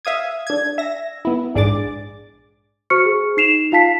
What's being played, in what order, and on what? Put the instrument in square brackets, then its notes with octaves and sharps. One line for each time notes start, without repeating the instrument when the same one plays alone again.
[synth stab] E5 F5 D#6 G#6
D4 G#6
E5 A#6
B3 E4
A#1 G#2 D4 G#4 D6 A6
[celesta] F#4 C5 C#6 F6 C#7
G#4
D#4 C7 E7 F7
F4 F5 A5 B6 C7